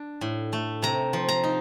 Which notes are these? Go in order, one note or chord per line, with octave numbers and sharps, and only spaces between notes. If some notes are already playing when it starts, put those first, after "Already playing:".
Already playing: D4
A2
A3
C3 A#5
F3
A#5
D#4